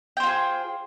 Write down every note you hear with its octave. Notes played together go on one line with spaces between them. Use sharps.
F4 G#4 C5 G5